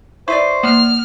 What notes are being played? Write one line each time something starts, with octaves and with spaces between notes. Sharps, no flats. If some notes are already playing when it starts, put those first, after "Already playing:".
E4 B4 C5 D5 C#6
A#3 F6